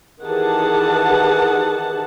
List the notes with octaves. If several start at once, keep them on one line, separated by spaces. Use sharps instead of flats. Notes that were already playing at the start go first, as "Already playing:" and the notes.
D#3 E3 G4 G#4 F#5 A5